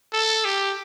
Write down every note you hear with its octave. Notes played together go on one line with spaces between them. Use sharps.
A4
G4